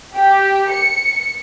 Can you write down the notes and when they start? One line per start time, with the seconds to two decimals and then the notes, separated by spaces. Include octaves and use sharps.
0.15 G4
0.70 C#7